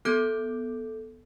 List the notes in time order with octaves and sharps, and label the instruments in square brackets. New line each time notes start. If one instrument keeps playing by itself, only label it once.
[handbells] B3 A4 D6 F#6 G6 D7